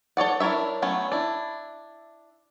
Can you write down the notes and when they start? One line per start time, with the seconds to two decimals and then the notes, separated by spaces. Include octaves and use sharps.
0.17 A4 C#5 D5 F#5
0.40 D4 E4 A#4 C#5 E5
0.82 F#3 A3 B3 C#4
1.12 D4 E4